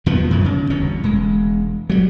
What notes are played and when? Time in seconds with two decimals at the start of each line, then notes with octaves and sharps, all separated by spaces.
0.06 D#2 D#3 F3 B3
0.31 F#2 B2 F3
0.44 C#3
0.70 G1 E2 B2 C#4
1.04 E1 G#3
1.90 F#3 G3